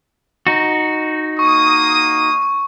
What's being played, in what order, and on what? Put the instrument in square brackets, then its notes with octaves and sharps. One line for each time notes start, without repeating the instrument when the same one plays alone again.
[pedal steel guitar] D#4 F#4
[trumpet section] A#3 D#6 [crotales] C#6